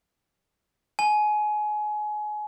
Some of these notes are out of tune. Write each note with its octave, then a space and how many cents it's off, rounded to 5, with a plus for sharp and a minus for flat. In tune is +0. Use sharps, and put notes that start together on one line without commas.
G#5 +25